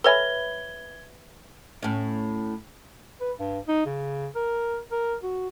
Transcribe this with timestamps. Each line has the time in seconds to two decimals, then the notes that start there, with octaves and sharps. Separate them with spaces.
0.04 A4 B4 C#5 E5 G#5 B5 G#6 G7
1.83 A2 C#4
3.21 B4
3.38 G2
3.68 D#4
3.86 C#3
4.35 A#4
4.91 A#4
5.23 F#4